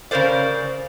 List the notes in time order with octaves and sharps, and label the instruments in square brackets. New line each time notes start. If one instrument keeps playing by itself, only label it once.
[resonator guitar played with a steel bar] C#3 G3 A#4 C5 D5